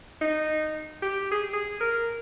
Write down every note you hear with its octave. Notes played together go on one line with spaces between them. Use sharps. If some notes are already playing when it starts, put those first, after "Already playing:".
D#4
G4
G#4
G#4
A#4